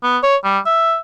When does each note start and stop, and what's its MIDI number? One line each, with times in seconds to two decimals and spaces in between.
0.03 0.18 59
0.23 0.36 73
0.44 0.58 55
0.66 0.98 76